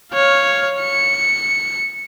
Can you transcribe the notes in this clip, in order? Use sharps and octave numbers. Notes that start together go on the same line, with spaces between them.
C#5 F5
C#7